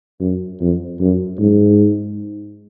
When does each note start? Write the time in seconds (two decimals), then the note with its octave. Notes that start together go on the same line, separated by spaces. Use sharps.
0.21 F#2
0.61 F2
1.00 F#2
1.40 G#2